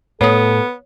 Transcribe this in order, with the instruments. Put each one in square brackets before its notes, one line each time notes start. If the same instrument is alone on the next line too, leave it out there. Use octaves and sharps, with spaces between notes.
[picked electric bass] A2 [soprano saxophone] B3 [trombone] A4 [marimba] C#5 D#6